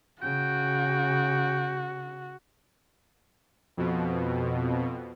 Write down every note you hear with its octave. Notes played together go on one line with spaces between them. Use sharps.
C#3 F#4 G5
F2 B2